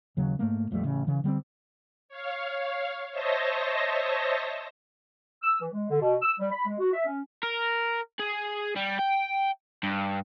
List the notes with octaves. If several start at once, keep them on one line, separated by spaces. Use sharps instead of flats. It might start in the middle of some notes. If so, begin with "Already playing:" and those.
D#2 C#3 F#3
G#2 A3 A#3
A#1 F2 G3 A3
A1 C#3
C#3 E3
D3 G3 G#3 C4
C#5 F5
C5 C#5 D#5 E5 A5 A#6
E6
E3
G#3
D3
B2
E6
G3
B5
G#3
F#4
E5
C#4
A#4
G#4
G3
G5
G2